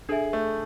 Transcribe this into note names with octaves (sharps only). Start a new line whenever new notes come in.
D4 G#4 A4 E5 G#5
A3